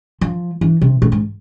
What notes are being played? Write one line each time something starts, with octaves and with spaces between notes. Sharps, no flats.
F3
E3
C3
A2
G#2